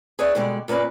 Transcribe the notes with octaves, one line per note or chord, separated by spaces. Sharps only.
G#4 B4 C#5 D5 E5
B2 D3 G3 G#3 C#5 D5
A#2 A#3 C#4 B4 D5